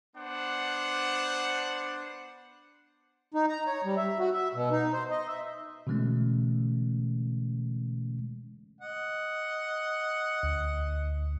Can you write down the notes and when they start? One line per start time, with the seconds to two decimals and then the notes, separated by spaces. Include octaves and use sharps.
0.16 B3 D4 C5 F#5
3.34 D#4
3.49 A#5
3.67 C#5
3.84 G3
3.97 E5
4.19 F#4
4.34 E5
4.54 B2
4.71 D#4
4.93 C5
5.11 D#5
5.27 E5
5.87 B2 D3 E3 G#3 A3 C#4
8.81 D#5 F#5
10.43 D2